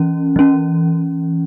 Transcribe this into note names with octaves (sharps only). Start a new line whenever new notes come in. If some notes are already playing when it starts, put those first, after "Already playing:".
Already playing: E3 C#4
E3 C#4